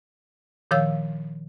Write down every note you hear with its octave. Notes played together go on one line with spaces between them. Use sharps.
A#2 D#3 F3 C#5 F5 E6